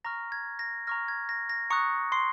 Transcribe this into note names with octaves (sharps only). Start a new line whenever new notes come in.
A#5 C#6 F6 A#6
G#6
A#6
A#5 C#6 F6 A#6
G#6
A#6
A#6
A#5 C#6 D#6 F#6 C#7
C6 C7